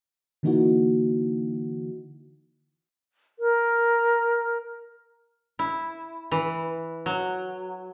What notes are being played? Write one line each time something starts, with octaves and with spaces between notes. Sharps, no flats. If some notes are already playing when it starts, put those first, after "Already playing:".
D3 E3 A#3 D#4 E4 F#4
A#4
E4
E3
F#3